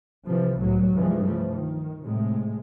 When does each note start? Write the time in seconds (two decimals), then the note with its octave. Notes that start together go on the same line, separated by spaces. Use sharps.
0.26 C3 E3 F3
0.58 C2 A2 F#3
0.92 C2 G2 C3 E3 F3 G#3
1.24 C#3 F3 A3
1.54 D#3
2.04 A2 C3 G#3